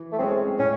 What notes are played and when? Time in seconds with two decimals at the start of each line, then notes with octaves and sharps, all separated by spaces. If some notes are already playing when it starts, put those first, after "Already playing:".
Already playing: E3
0.12 A3
0.19 G#3 C4 C#4 G#4 C#5
0.59 A2 C#4